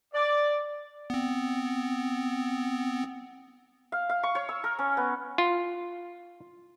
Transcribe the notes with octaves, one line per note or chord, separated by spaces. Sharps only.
D5
B3 C4
F5
F5
C#6
C#5
E6
A#4
C#4
B3
F4